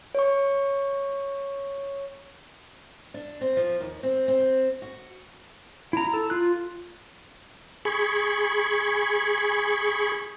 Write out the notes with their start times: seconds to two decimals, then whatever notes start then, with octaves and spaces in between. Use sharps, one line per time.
0.15 C#5 C#6
3.14 D4
3.41 C4
3.57 F3
3.80 D#2
4.03 C4
4.28 C4
4.82 F#4
5.93 E4 A#5
6.14 A4
6.30 F4 F#6
7.85 G#4 B5 C#6